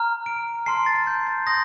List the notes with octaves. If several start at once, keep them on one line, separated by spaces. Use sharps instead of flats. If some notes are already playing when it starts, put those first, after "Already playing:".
Already playing: A#5 F6
D7
A5 C6 F6 C7
A6
G6
A6
C6 D#6 G6 A#6